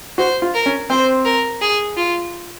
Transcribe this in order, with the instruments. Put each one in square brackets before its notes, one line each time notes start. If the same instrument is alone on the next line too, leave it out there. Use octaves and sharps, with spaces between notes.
[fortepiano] F#4 [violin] C5
[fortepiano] F4
[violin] A#4
[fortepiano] C#4
[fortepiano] C4 [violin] C5
[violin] A#4
G#4
F4